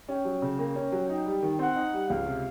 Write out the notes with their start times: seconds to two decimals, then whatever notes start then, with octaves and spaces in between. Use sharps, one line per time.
0.09 C#4 G5
0.25 F#3
0.42 C#3
0.59 A#3 G5
0.76 C#4
0.92 F#3
1.09 D#4 G5
1.26 G3
1.43 D#3
1.59 C4 F#5
1.76 D#4
1.93 G3
2.09 C#2 F5
2.26 C3